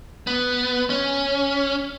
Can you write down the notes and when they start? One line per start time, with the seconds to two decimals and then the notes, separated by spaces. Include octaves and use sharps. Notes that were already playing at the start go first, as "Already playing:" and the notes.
0.27 B3
0.90 C#4